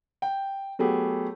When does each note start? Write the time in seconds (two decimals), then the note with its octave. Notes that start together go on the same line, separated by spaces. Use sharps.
0.22 G5
0.79 F#3 A3 B3 G4 G#4